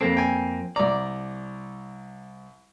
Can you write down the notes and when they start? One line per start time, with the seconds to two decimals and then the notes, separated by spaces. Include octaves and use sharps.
0.01 F2 A#3 C4 A4
0.17 G5 G#5
0.76 C2 D5 A#5